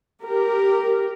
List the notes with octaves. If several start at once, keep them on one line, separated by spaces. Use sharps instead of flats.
G4 A#4